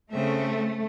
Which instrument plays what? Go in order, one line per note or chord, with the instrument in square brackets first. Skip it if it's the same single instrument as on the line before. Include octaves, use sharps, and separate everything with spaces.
[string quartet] C#3 C4 E5 [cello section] A3